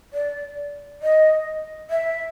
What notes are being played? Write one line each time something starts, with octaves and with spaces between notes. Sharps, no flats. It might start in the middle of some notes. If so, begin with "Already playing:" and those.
D5
D#5
E5